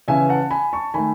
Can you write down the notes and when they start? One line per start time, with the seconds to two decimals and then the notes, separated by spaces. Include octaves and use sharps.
0.08 C#3 E3 B3 E5 G#5
0.29 F#5 A5
0.51 G#5 B5
0.73 A5 C#6
0.94 D#3 A3 G#5 B5